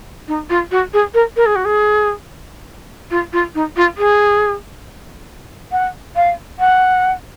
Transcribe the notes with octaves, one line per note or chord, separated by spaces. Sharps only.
D#4
F4
F#4
G#4
A#4
A#4
G#4
F#4
G#4
F4
F4
D#4
F4
G#4
F#5
F5
F#5